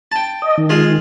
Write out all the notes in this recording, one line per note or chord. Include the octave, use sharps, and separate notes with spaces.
G5 A5
D#5
D#3
G#3 F4